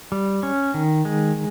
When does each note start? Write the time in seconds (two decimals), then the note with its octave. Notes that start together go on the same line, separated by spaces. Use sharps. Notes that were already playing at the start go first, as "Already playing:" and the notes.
0.12 G3
0.43 C#4
0.74 D#3
1.05 G#3